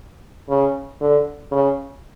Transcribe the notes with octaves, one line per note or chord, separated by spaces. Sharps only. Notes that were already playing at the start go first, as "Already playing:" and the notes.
C#3
D3
C#3